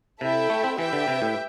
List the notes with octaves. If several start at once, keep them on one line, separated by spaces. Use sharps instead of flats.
C3 E4 A4 E5 G5
A3
C4
E3 G4 B4 E5 G5
D3
C3
A2